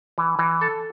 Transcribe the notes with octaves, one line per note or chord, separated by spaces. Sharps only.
E3
E3
A4